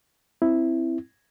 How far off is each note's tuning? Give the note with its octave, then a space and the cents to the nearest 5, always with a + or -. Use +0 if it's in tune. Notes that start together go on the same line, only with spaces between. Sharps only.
C4 +0 E4 +0